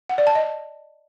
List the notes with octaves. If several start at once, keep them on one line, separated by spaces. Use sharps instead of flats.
F#5
D5
A5
D#5